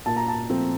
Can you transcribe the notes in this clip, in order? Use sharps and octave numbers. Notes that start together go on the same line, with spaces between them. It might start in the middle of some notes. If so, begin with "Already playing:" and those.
A#2 A5
A#5
A5
F3 A3 C4